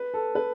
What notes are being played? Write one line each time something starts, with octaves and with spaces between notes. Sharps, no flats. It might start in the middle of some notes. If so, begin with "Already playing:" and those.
Already playing: B4
A4
B4